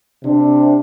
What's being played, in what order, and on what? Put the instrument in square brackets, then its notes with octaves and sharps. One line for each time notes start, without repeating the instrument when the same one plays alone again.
[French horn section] C3 D4